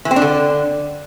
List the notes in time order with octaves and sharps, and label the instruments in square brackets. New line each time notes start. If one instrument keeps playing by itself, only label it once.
[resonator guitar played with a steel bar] E3
C4
D4
D3